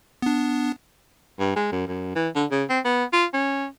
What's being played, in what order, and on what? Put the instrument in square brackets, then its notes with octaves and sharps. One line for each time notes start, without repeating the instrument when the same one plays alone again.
[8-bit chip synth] B3 D4
[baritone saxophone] G2
G#3
F#2
F#2
E3
D3
C#3
C4
B3
F4
C#4